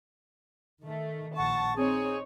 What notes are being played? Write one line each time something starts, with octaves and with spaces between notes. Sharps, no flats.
D#3 A3
A#1 F#5 A5 C#6
C4 D#4 G#4 C#5